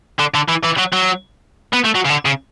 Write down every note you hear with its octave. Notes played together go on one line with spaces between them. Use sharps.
D3
D3
E3
E3
F#3
F#3
B3
A3
F#3
C#3
D3
C#3